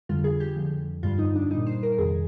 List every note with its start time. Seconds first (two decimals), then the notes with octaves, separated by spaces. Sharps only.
0.09 F2 D3 G3 F4
0.24 G#4
0.40 G4
0.56 F2 D3 F3
1.03 G2 D3 G3 F4
1.19 D#4
1.36 D4
1.51 A#2 G3 D#4
1.66 C5
1.83 A#4
1.98 F2 C3 D#3 G#4